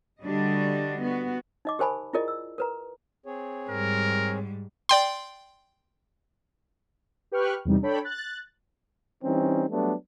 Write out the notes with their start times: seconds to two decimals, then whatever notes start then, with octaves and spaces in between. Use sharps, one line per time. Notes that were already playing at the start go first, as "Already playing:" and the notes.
0.24 D3 G3 D4 F#4 D#5
1.04 B3 F#4
1.65 D#4 D#5 D6
1.79 G4 A#4 C5 G#5 A5 B5
2.13 E4 F4 G#4 A#4 D5 D#5
2.28 E6
2.58 A#4 B4 A#5
3.26 C4 G#4 C#5
3.69 G#2 G3 A#4
4.89 D5 G5 C6
7.32 G4 B4 G5 C#6 F6 F#6
7.65 E2 C3 G3 D#4
7.82 D4 A4 C#5 G5 B5
8.04 F#6 A6
9.23 E3 G3 C4 C#4 D#4
9.71 F#3 G3 A3 B3 D4